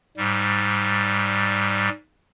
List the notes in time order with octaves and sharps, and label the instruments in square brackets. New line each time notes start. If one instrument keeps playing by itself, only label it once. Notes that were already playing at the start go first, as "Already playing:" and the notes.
[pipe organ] G#2 G3